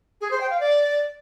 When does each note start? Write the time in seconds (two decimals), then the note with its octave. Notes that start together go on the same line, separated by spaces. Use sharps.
0.20 G#4
0.30 C5
0.40 G5
0.50 F5
0.60 D5